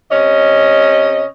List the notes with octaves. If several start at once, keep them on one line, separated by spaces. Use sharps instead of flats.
C3 C#4 D#5